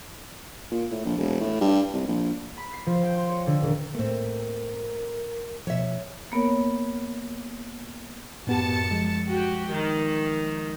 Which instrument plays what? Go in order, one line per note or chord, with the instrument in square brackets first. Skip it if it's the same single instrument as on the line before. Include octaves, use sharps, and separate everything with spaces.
[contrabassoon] A#2
A2
A#1
E1
A2
G2
C2
A#1
[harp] B5
C7
F3
G5
C6
C#5
D3
D#1
[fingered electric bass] A2 A#3 [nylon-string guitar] A3 C4 [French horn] A#4
[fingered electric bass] B2 F3 [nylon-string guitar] C#5 E5
[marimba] A#3 B3 A#4 C#5
[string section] F#2 A5 C#7 [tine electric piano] A2 B3 G4
[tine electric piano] F3 G#3
[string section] F#4 G4
D#3